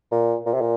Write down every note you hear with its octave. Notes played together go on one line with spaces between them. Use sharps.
A#2
A#2
C3
A#2